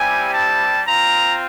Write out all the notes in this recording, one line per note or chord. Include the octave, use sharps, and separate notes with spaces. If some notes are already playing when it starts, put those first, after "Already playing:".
Already playing: G3 C4 E4 G4 G#5
A5
C4 F4 A#5